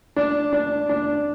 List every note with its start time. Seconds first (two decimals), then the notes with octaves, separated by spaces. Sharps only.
0.16 D4
0.53 D4
0.89 D4